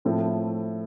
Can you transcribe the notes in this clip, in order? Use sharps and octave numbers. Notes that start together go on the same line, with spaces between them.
A2 F3 C4 E4 A4